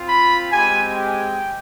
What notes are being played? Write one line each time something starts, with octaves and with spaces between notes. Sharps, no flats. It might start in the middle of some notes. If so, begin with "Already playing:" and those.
Already playing: C4 F4
B5
G#3 C4 G4 G#5
G5